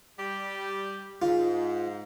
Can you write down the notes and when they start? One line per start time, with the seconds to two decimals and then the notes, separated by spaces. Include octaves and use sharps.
0.19 G3 G4
1.22 G#2 F4